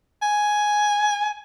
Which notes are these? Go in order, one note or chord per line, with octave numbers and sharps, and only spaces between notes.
G#5